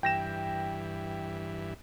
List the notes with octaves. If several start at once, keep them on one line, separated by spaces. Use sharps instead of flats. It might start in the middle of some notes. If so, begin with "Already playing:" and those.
G2 E3 G5 A#6 E7